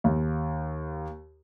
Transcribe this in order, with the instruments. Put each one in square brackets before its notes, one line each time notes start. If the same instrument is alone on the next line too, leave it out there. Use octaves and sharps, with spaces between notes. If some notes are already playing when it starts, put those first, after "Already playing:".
[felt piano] D#2